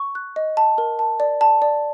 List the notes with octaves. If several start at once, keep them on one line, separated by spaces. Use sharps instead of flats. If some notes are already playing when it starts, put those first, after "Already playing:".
Already playing: C#6
F#6
D#5
A5
A#4
A5
D5
A5
D5